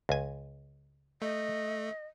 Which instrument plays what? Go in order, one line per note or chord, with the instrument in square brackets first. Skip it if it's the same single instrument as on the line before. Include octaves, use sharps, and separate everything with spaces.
[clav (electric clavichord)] C#2 G#5
[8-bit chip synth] A3 [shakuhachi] D#5